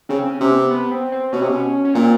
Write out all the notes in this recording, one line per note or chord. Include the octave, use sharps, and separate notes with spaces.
C#3 C4
C#4
C3
B3
B3
C4
C4
B2 C#4
C3
B2
C#4
A#2 C4